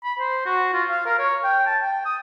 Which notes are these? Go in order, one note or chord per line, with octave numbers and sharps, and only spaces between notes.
B5
C5
F#4
F4
F5
A#4
C#5
G5
A5
G5
D#6